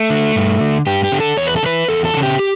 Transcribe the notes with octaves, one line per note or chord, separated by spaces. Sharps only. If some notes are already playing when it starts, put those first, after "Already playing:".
Already playing: A3
D3
G2
D3
G2 G4
G4
D3
A4
E2 C#5
B4
A4
C#3
E3 B4
E2 A4
A4
E3
C#3
G4
G4